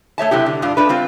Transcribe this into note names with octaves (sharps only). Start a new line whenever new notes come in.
A3 C#5 E5 A5
C3 F#3 E4 G4
D3
G2 D4 F4
A3 D4 B4
G3 C4 F4